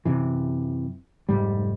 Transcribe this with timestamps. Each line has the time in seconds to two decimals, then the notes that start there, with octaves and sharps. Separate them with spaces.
0.05 F#2 C3 E3
1.29 F1 G#2 G3